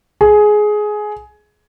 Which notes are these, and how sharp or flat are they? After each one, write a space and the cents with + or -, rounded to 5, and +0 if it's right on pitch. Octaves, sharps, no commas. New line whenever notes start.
G#4 +15